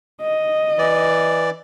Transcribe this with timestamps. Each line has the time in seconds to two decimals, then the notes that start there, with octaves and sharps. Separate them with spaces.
0.21 D#5
0.78 E3 D5